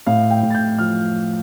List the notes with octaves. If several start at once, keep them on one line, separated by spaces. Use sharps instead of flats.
A2 F5
G5
A2
A6
G6
F3 F6